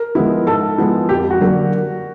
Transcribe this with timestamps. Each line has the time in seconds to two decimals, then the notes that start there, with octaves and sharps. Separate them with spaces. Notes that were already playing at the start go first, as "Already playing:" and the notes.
Already playing: A#4
0.15 F3 G#3 B3 E4
0.47 G#2 A4
0.78 F3 G#3 B3 E4
1.09 F2 G4
1.30 F#4
1.41 D3 F#3 A#3